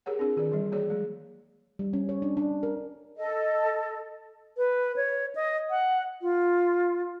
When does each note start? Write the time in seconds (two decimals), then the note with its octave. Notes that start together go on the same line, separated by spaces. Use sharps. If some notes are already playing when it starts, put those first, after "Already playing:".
0.06 G4 G#4 A#4 C#5 F#5
0.19 C4 D4 F4 G#4
0.37 D#3 G#4 A#4 D5
0.52 E3 G3
0.72 A#3 F#4 G#4 C#5 D5
0.89 F#3 G#3 G#4
1.79 G3
1.93 C#4
2.09 C#5
2.22 D4
2.37 D4
2.63 A#4
3.18 A4 D#5
4.57 B4
4.96 C#5
5.35 D#5
5.70 F#5
6.22 F4